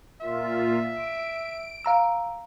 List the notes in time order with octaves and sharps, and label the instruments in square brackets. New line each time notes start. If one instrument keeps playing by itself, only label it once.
[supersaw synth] A#2 F4 [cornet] E5
[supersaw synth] D7
[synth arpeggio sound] F5 A#5 E6